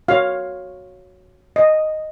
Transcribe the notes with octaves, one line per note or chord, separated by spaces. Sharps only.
F#4 C#5 F5
D#5